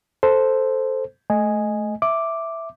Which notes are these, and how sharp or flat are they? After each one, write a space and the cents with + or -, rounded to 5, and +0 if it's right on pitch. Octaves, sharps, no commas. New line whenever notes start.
A4 +0 C5 +0
A3 -20 D#5 +0 G#5 +0
E5 +0 D6 +0